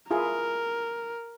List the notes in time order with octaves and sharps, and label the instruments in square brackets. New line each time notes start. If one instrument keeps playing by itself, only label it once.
[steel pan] E4 F4 G#4 [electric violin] A#4